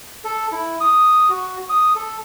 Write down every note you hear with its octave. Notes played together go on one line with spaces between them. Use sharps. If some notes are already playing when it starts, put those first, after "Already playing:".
A4
E4
D#6
F#4
D#6
A4